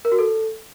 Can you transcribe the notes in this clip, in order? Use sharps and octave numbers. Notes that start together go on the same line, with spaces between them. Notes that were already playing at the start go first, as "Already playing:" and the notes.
A#4
F#4
A4